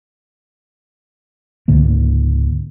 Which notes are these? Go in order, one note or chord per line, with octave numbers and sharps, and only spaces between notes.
C#2 G#2 D3 A#3